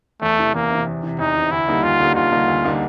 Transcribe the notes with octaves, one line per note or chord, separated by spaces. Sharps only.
E2 A3
C3 E3
E2 A#3
C3 E3
E2
C3 E3
E2 D#4
C3 E3
D2 E4
D3 G3 A#3 D#4
D2 F4
D3 G3 A#3 D#4
D2 F4
D3 G3 A#3 D#4
D2
D3 G3 A#3 D#4